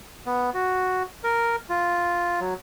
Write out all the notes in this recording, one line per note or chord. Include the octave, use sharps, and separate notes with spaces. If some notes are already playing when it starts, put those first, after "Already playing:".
B3
F#4
A#4
F4
F#3